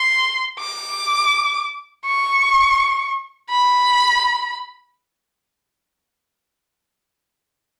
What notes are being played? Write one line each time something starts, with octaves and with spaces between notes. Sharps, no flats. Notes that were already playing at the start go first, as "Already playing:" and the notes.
Already playing: C6
D6
C#6
B5